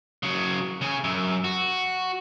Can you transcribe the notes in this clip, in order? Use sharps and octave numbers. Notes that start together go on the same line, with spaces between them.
C#3 F#3
C#3 G#4
F#2
F#4